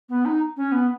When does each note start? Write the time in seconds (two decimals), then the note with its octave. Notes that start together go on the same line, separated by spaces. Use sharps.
0.09 B3
0.25 D#4
0.57 C#4
0.72 B3